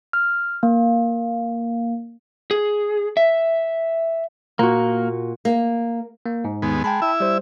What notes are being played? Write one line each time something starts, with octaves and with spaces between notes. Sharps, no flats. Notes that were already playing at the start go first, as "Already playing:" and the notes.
F6
A#3
G#4
E5
A#2 A#3 F#4
A#3
A#3
G#2
D#2 G#3 B3
G#3 G5 A5 B5
E4 E5
G3 C5